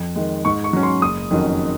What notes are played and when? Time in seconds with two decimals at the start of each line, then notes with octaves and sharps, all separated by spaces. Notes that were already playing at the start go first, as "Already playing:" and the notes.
Already playing: F2
0.16 D#3 G#3
0.45 G#2 C#6
0.64 C#6
0.73 F#3 C#4
0.83 C6
1.02 F#1 D#6
1.31 F2 D#3 F#3 C#4